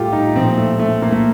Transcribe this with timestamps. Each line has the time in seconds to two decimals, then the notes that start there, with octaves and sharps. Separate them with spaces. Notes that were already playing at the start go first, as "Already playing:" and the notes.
Already playing: A2 G3 F4 G4 A4
0.12 D#4
0.35 A#2 F3 C4
0.58 A3
0.79 A3
1.02 A#3
1.12 A3